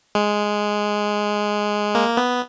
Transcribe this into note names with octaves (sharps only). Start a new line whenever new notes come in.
G#3
A#3
B3